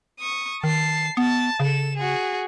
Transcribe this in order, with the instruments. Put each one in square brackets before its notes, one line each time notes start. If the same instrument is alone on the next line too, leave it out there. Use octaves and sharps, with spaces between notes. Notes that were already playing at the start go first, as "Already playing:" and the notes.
[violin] C#6 D#6
[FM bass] D#3 [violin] A5 C7
[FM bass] B3 [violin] A5
[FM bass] C#3 [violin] A4 E7
[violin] F#4 G#4